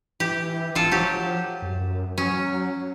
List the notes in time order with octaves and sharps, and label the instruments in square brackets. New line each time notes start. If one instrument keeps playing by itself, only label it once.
[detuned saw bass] E3 [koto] G4
[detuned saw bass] D1 [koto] F4 A4
[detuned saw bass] F3 [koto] F#3 G4
[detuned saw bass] F#2
[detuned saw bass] F#3 [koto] C#4